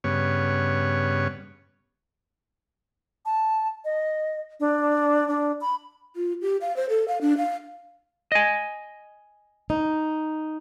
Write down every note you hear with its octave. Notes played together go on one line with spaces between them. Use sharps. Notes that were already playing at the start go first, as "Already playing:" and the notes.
G2 C#3 B3 C#5
A5
D#5
D4
D4
B5
F4
G4
F5
C5
A4
F5
D4
F5
D#5 G#5
D#4